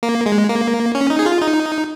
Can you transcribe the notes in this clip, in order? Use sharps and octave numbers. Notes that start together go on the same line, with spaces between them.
A#3
G#3
A#3
C#4
D#4
G#4
F4
D#4